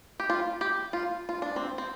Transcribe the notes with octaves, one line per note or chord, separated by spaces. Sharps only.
G4
F4
G4
F4
F4
D4
C4
C4